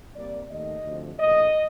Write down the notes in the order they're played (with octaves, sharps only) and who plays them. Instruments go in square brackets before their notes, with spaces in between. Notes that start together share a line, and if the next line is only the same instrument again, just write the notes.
[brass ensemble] C2 C3 G3 A#3 D5
D#2 D#3 A3 D#5
D2 C3 F3
A#1 A2 A3 D#5